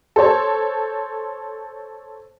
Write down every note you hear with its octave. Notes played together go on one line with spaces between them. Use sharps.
A4 C5 C#5 A5